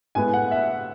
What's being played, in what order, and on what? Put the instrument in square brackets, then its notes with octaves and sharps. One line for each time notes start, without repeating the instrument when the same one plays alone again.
[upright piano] A2 G#3 B3 G#5
F#5
E5